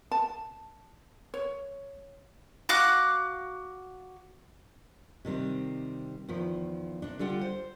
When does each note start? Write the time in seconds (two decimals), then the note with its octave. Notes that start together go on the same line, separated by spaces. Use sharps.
0.11 A5
1.34 C#5
2.69 F#4 F5 D6 F#6
5.25 C3 D#3 G3 C4
6.28 E2 D#3 F3
7.02 C3 D4
7.19 D3 G3 F4 F#5 G5
7.41 C5